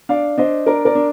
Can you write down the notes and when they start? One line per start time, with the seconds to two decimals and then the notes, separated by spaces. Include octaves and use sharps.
0.09 D4 D5 F5
0.38 D4 C5 D#5
0.66 D4 A#4 D5
0.85 A#4 D5
0.95 D4